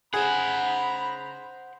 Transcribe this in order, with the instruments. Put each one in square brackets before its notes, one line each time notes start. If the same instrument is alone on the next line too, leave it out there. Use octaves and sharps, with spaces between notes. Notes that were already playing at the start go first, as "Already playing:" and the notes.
[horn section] C#3 A#5 B5 [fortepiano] G#4 [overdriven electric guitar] C5 F#5